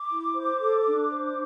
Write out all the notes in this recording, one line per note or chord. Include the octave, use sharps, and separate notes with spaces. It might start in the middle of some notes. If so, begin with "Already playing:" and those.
Already playing: D6
E4
C5
A4
D4
C5